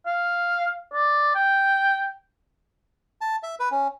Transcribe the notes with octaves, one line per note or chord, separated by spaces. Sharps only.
F5
D5
G5
A5
E5
B4
C#4